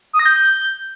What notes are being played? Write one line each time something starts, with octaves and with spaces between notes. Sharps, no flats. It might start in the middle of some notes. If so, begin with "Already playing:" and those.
D#6
A#6
G6